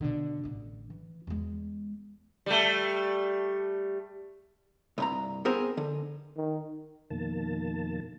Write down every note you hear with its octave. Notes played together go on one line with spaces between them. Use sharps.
B2 D3
A1 D3
E3
E2 G#3
G3 A3
C2 G2 A#5
B3 C4 G#4 A#4 C5
D3
D#3
F2 B2 D#3 A#3 A5